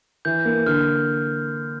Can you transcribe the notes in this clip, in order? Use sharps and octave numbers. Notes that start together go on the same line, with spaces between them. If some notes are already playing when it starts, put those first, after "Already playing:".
E3 G6
A#3
D3 F6